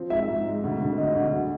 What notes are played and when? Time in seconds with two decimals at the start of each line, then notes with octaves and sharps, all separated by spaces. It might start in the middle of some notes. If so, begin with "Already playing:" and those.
Already playing: F3 C4
0.10 G#2 E5
0.29 G#2
0.46 G#3
0.64 D2
0.80 D2
0.98 D3 D#5
1.15 D2
1.33 F#3